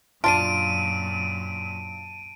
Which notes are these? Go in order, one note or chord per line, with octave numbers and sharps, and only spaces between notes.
F#2 A#2 D4 F4 A5 D7 D#7